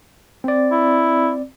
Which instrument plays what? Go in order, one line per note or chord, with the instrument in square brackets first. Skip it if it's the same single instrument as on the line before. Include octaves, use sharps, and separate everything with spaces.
[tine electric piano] C4 D5
[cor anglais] E4